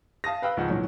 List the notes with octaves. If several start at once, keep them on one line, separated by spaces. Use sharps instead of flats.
F5 A5 D#6 A#6
B4 F5 G5 E6 F#6
C#2 G#2 D#3 F3 D#4 F#5
A#2 D#3 E3 F#3